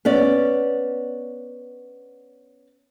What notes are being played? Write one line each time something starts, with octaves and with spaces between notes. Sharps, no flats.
B3 C#4 D5